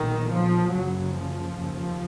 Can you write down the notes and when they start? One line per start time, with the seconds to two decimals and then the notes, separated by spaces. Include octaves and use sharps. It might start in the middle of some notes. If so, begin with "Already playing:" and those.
Already playing: B1 A#2 D#3
0.31 F3
0.73 F#1 F#2 C#3 F#3
1.15 F3
1.57 F1 D#2 C#3